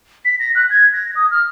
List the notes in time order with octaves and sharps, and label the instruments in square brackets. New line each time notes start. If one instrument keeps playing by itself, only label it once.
[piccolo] B6
A#6
F#6
G#6
A#6
D#6
F6